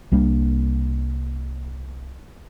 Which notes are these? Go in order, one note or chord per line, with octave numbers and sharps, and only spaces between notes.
C2 G3 A#3 D4